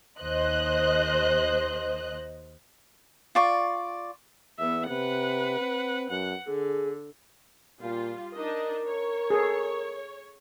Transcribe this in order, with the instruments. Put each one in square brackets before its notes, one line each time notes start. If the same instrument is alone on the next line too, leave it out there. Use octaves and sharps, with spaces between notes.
[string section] D#2 C5 D#5 F#6
[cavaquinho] F4 D5 C#6
[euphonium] E2 [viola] B3 E5
[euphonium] C3 [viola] B4 F#5
[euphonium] C4
[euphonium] F#2 [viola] F#5
[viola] D3 [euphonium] G#4
[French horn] A#2 [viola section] G3 F4
[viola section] D4 D#4 D#5 [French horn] A#4
[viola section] C#5
[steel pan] G#4 A4